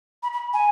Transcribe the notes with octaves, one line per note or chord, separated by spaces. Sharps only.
B5
B5
G#5